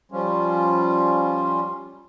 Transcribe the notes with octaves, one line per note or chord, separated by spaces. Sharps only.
F3 G3 C#4 F4